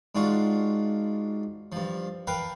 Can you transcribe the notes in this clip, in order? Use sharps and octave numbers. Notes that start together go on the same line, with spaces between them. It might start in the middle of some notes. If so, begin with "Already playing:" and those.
G#2 D4 F4 F#4
G2 F3
A#4 B4 F5 G5 A5